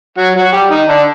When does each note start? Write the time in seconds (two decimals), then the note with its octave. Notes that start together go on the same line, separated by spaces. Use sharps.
0.17 F#3 F#4
0.36 F#3 F#4
0.52 G3 G4
0.70 D#3 D#4
0.88 D3 D4